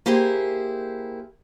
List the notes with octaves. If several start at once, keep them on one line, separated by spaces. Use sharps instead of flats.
A#3 E4 G4 G#4 C5